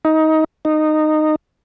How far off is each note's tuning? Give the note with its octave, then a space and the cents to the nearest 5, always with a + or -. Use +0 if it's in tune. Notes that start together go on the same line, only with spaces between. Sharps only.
D#4 +20
D#4 -15